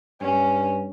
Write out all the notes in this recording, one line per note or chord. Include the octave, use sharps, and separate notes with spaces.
G2 C#4